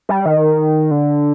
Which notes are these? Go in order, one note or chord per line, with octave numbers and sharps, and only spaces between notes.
G3
D#3
D3